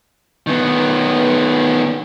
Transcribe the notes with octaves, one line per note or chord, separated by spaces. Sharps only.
D#3 B3